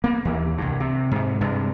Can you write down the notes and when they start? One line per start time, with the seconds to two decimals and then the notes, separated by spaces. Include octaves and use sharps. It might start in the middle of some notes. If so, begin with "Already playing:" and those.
0.04 A#3 B3
0.25 D#2 E3
0.58 C2 G2
0.80 C3
1.11 G#2 C3
1.41 G2 C3 G#3